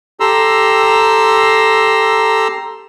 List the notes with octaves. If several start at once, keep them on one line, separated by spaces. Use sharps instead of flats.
G4 A4 A#5 C6 E6